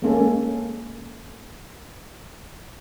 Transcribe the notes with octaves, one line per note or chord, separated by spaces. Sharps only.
G#3 A#3 C#4 A4